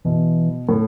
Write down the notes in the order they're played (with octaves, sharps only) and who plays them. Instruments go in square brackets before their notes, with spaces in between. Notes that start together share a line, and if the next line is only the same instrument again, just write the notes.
[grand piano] B2 [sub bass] E3
[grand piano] A2